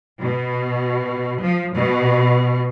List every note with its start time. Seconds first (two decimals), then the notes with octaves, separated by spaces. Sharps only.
0.21 B2
1.40 F3
1.76 B2